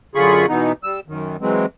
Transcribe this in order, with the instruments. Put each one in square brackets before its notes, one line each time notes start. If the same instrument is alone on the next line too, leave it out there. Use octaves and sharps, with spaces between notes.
[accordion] F#2 D3 F4 G#4 B5 C#6
B2 E3 B3 D#4
G3 E6
F#2 D#3
E3 F#3 G#3 C4